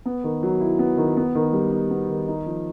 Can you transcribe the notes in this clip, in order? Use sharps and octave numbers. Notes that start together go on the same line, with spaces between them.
B3
D#3
F#3
E4
B3
D#3
B3
D#3
G3
D#4
B3
D#3
D#4
F3